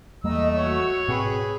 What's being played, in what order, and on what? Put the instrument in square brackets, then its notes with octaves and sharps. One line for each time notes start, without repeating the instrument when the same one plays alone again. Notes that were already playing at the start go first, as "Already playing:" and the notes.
[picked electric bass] E2 G3 A#3 [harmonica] A3 E6 [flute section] D#5
[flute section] F#4 [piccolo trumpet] C#5
[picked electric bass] G#2 B2 C4 [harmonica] G#4 B4